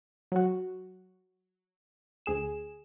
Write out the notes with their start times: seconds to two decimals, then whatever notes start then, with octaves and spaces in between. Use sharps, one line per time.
0.32 F#3 F#4
2.26 D2 G#4 E7